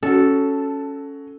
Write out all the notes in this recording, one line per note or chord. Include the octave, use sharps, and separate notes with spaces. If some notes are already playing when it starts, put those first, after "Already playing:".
C#4 F#4 A4